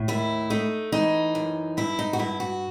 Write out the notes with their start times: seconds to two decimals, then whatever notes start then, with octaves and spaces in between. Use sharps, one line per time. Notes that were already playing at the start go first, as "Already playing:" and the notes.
Already playing: A2
0.08 D#2 E4
0.50 A3 D#4
0.92 E3 D#4
1.35 F#2
1.77 G2 E4
1.99 D#4
2.13 F#4
2.19 G2 E4
2.40 F#4